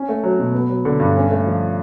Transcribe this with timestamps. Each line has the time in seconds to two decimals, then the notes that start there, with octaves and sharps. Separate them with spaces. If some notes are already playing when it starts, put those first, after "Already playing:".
Already playing: C#4
0.09 A3
0.24 F#3
0.39 B2
0.54 B3
0.69 F#3
0.85 D3
1.00 G2
1.16 C#4
1.30 A3
1.46 F3